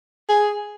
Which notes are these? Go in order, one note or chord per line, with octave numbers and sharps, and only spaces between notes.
G#4